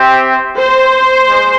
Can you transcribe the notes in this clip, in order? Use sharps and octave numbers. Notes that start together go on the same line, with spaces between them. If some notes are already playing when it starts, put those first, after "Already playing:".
Already playing: C4 G4 C5 E5 G5
C5
G#3